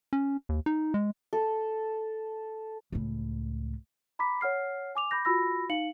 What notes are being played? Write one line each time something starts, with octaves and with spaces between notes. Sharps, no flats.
C#4
D#2
D#4
G#3
A4
C#2 A2
A#5 B5 D6 B6
C#5 F#5 F6 C7
G#5 D6 F7
B5 D6 G6 A#6
F4 F#4 B5 E6 A#6
D#4 F5 C#7 F#7